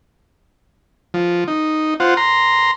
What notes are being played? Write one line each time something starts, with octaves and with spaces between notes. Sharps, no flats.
F3
D#4
F4 C5 F#5
A#5 C6